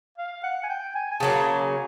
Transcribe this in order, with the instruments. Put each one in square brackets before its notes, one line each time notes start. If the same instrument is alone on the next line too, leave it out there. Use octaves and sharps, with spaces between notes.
[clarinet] F5
F#5
G#5
G5
G#5
G#5
[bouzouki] C#3 F#3 A#3 [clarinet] A5
[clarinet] G#5